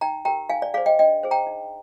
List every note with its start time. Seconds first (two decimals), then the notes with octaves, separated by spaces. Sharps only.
0.01 D#4 G5 A#5
0.25 G4 A#4 G5 A#5
0.49 D#4 F5 G#5
0.62 D5
0.74 G#4 C5 D5 F5
0.86 D#5 G5
0.99 D4 D#5 G5
1.23 G#4 C5
1.31 G5 A#5
1.47 D#4